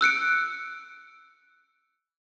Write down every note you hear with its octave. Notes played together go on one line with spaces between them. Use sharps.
E6 F#6 C#7 D7